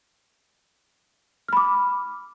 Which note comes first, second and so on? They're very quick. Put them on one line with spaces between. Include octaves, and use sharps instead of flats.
F6 B5 D6